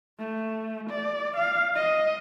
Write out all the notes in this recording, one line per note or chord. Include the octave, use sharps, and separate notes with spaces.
A3
D5
F5
D#5